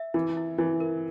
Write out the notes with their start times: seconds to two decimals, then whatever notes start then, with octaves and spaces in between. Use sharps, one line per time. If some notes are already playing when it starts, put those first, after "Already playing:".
Already playing: E5
0.14 E3 E4
0.37 E4
0.58 E3 E4
0.80 A#4